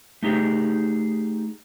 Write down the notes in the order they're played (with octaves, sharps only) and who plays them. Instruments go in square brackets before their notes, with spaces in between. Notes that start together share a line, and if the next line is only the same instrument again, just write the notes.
[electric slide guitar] A3 D#4 G4 G#4